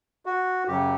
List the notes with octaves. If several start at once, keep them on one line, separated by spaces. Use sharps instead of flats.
F#4
F#2 C#3 F#3 G4